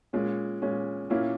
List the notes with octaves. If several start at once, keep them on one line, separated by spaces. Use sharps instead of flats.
A#2 G#3 C#4
A#2 G#3 C#4
A#2 A#3 C#4 E4